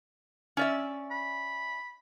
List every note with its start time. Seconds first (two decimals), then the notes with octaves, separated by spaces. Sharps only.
0.57 C#4 D5 E5
1.11 B5